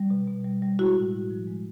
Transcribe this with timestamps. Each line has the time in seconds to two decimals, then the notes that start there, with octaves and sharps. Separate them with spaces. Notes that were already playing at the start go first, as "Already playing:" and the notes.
Already playing: G3
0.10 B2
0.27 B2
0.44 G3
0.62 G3
0.79 G#3 E4 F#4
0.96 A2
1.13 A2
1.30 F3
1.47 G#3